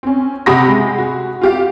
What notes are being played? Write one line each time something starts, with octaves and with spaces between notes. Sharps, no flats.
C4 C#4
C3 G4 F#5 B5 D#6 A#6
G#3
F#4
F4 G4 F5